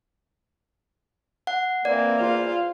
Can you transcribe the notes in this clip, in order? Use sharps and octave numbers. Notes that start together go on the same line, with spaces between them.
F#5
E3 A#3 C4 D5
E2 F4 C5